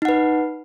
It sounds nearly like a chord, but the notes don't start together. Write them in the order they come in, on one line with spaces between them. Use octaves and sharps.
D#4 F#5 B4